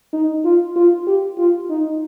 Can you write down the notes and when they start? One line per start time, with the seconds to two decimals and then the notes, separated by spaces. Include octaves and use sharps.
0.13 D#4
0.45 F4
0.76 F4
1.07 G4
1.38 F4
1.70 D#4